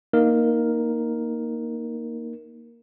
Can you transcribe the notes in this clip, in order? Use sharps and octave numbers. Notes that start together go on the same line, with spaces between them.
A#3 D#4 A#4